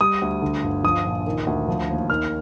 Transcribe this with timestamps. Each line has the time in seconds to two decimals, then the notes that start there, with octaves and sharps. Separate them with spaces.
0.01 G3 D#6
0.22 D2
0.41 D3
0.64 G1
0.83 F3 D#6
1.05 A#1
1.26 D#3
1.47 D2
1.68 F3
1.89 D#2
2.10 D#3 F6